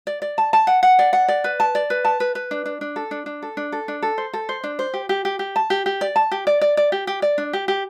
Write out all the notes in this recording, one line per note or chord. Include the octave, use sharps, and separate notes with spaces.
D5
D5
A5
A5
F#5
F#5
D5
F#5
D5
B4
A5
D5
B4
A5
B4
B4
D4
D4
D4
A4
D4
D4
A4
D4
A4
D4
A4
C5
A4
C5
D4
C5
G4
G4
G4
G4
A5
G4
G4
D5
A5
G4
D5
D5
D5
G4
G4
D5
D4
G4
G4